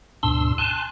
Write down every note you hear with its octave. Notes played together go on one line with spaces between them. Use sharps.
D2 G#2 B2 D4 C6 E6
G#5 A5 C6 F#6